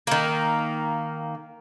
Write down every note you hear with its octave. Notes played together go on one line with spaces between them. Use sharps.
D#3 A#3